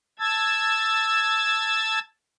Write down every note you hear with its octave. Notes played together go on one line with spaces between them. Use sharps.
A5 E6 G#6 A6